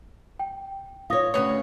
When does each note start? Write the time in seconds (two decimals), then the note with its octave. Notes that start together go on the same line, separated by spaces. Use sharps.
0.39 G5
1.10 F4 C#5 F5 D#6 A#6
1.34 D2 C#3 B3 C#5